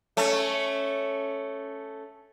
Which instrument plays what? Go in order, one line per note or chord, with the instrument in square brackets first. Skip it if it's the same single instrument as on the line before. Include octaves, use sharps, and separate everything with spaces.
[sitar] A3 C#4